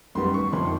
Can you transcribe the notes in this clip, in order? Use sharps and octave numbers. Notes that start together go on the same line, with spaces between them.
F#2 D#3 G3 B3 C6
C#6
F2 C3 D#3 C6